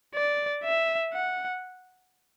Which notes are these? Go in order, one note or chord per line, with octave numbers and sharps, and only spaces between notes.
D5
E5
F#5